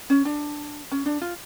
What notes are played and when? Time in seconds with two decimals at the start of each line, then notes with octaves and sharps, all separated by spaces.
0.10 C#4
0.25 D4
0.92 C#4
1.06 D4
1.22 F4